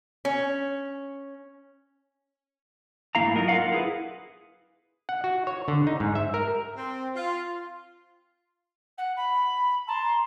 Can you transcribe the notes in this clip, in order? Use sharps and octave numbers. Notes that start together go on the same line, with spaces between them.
C#4
G#2 A3 A#3 E4 F5 A#5
F#3 D#4 F4 A#4
F4 F#4 A#4 F5 F#5
E4 G#4 B4
F#5
F#4
C#5
D3
D#4
G#2
E5
A#4
C4
F4
F#5
B5
A5 A#5 C6